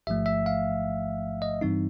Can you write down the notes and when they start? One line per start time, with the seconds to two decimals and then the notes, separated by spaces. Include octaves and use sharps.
0.07 A1 G#2 F3 A3 E5
0.26 E5
0.46 F5
1.42 D#5
1.61 G2 E3 G3 C4 D#4